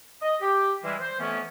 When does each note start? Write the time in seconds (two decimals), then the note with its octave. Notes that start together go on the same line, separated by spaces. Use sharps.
0.22 D#5
0.41 G4
0.83 E3 G3 G#3 E4
1.00 C5
1.19 F2 E3 A3 B3 C#4